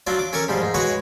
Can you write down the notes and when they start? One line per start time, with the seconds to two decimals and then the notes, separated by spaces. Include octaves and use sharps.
0.07 F#3 D4 F4 E5
0.19 D6
0.33 C#4 A4 A#4 C#6 D6
0.48 G#2 F3 G3
0.62 G#2
0.74 G#3 F#4 B4 C#5 F#5 C#6